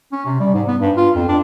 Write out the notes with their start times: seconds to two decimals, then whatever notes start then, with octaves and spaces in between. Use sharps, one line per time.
0.12 C#4
0.26 C3
0.40 G3
0.54 G#2
0.68 B3
0.81 G2
0.97 F4
1.15 F2
1.28 D4